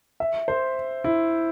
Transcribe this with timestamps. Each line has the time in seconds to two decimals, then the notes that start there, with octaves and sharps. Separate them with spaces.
0.20 E5
0.48 C5
1.04 E4